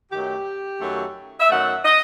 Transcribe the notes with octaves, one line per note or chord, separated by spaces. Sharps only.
F#2 D#3 F#3 A3 G4
F#2 D#3 F#3 A3
E5
F#2 D#3 F#3 A3 F#5
D#5